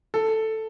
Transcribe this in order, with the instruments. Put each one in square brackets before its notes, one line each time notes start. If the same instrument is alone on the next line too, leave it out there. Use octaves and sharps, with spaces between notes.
[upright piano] A4